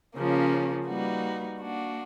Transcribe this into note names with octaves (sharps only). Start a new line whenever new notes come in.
C#3 F3 A#3 C#4
G3 A#3 D#4 F#4 B4
A#3 D4 F#4